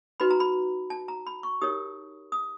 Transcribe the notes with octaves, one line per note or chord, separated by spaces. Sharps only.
D#4 F#4 B4 B5
A#5
B5
A5
A#5
B5
C#6
D#4 G4 A#4 C#5 D#6
D#6